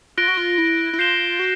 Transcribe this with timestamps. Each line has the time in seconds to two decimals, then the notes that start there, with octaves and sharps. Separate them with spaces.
0.17 F4 F#6 A#6 D7 G7
0.28 F#4
0.37 F4
0.58 E4
0.93 E4
0.98 F4 G6 C7 E7 G7
1.39 F#4